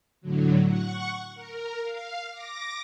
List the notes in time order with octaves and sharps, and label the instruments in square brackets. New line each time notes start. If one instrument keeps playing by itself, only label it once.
[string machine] A2 D3 F#3
F#5 C#6
A#4
F5
D6 A#6